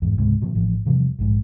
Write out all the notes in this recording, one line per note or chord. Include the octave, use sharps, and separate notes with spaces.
E2 G#2 F#3
C#2 G#2 C3 G#3
A#2 D3 F3 F#3
A1 A2 F3
E2 C3 F3 G3
A#1 G#2